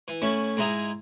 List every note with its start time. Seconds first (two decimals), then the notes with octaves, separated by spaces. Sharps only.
0.08 E3
0.22 A2 C#4 E4
0.57 G#2 G#3 E4 A#5 D#6